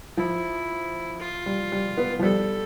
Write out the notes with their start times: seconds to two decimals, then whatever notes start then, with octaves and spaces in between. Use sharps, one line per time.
0.17 F3 E4
1.20 F4
1.46 G3
1.72 G3
1.97 B3
2.19 F3
2.23 G3 A4